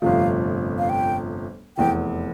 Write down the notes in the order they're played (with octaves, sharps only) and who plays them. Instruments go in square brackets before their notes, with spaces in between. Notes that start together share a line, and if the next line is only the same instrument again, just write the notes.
[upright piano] G1 F2 C3 F3 A3 [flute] F5
[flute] F5
G5
[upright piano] F1 E2 E3 [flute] G5